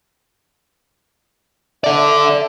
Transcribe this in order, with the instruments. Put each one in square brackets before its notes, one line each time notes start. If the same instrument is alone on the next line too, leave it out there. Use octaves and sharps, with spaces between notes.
[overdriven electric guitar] A4 D5 [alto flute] E5